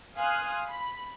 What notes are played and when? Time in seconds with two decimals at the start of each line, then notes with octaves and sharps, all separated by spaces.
0.16 F5 G#5 C6 D#6 F6 F#6
0.67 B5